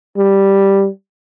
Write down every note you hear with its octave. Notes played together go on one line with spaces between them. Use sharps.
G3